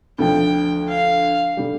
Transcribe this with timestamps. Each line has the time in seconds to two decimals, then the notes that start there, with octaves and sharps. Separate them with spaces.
0.18 D2 D3 F3 G5
0.88 F5
1.57 D3 G3